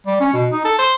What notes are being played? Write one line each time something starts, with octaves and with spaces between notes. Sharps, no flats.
G3
C#4
B2
D#4
A4
C5